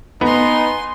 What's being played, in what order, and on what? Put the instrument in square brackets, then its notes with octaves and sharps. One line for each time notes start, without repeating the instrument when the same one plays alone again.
[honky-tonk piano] B3 [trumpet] D#4 [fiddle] G#5 C6